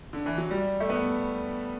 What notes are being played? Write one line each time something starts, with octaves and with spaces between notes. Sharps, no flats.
D3
E3
F#3
G3
A3
B3